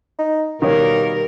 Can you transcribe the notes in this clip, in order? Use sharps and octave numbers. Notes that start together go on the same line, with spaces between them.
D#4
B2 D#3 G3 A#3 A#4 C#5